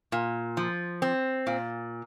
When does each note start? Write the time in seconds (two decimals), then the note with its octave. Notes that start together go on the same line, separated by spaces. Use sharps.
0.12 A#2
0.57 F3
1.02 C4
1.47 A#2